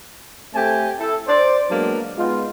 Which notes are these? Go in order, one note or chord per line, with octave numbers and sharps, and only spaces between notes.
A3 C4 G4 A4 G#5
E4 A4
C5 D5
F#3 G#3 A#3 B3 D4
G#3 B3 D#4 F4